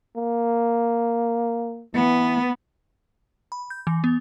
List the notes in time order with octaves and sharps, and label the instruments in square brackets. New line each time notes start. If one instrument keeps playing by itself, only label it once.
[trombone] A#3
[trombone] E3 [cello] B3
[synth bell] B5
G6
E3
B3